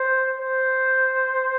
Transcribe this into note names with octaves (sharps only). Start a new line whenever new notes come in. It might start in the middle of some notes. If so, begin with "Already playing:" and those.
Already playing: C5
C5